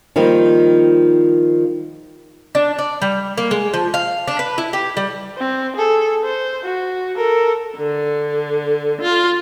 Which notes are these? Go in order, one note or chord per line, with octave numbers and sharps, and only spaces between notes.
D#3 F3 G3 A#3 D#4
D4
D5
G3
A#3
G#3
F3
F5
D4
B4
E4
G4
G3
C4
G#4 A4
C5
F#4
A4 A#4
D3
F4